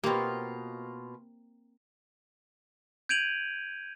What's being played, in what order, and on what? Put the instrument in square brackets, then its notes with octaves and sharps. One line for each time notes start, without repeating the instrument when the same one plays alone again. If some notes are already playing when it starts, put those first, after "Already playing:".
[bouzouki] B2 F4 [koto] A#3 C4 [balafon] G4
[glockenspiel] G6 G#6 D7 D#7 F7 F#7